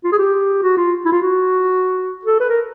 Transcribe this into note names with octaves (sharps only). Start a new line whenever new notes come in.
F4
G#4
G4
F#4
F4
E4
F4
F#4
A4
B4
A#4